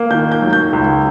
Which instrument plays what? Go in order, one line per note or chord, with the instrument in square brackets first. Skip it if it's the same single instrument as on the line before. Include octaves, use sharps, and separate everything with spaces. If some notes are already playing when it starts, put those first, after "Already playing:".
Already playing: [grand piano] A#3
D#3 G6
G6
F#3
G6
C#2